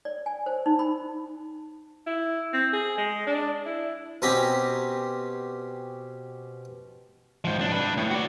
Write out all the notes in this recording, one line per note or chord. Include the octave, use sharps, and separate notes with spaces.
D5
G#5
C5
D#4
B5
E4
C4
G#4
G#3
D4
E4
B2 C4 C#4 G4 A#5 B5
G#2 F3
C2 D4
D4 B4
A2
F#4 D5